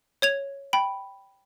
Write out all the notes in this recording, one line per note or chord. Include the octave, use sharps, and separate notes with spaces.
C#5 G#6 F7
G5 B5